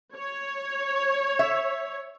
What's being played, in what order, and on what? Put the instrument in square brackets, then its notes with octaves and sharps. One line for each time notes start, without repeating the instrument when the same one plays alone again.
[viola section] C#5
[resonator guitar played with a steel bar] E5